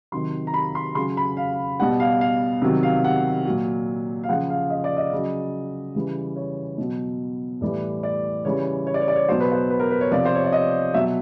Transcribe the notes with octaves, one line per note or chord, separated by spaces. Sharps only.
C3 D#3 F#3 C6
A#5
B5
C6
C#3 F#3 C6
B5
F5
B2 G3 F#5
F5
F5
C3 D#3 F#3
F5
F#5
A#2 F#3
F5
C#3 F3 F#5
F5
D#5
D5
D#5
C#3 F#3
C#3 E3 G3
C#5
B2 F#3
A2 E3 G3 D5
D5
C#3 E3 G3 C#5
C#5
D5
C#5
D5
C#5
B2 F#3 C5
B4
C5
B4
A#4
B4
C#5
C3 F3 D5
C5
C#5
D5
D#5
B2 F#3 E5